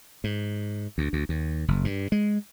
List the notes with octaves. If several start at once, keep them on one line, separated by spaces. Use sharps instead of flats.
G#2
D2
D2
D#2
F#1
G2
G#3